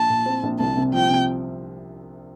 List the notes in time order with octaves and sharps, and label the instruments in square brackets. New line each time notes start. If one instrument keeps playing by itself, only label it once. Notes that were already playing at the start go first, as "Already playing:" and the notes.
Already playing: [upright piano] A#1 [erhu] A5
[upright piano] A#2
C4
A#1
[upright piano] C2 [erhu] A5
[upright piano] C3
[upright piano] F3 [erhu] G5
[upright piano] C3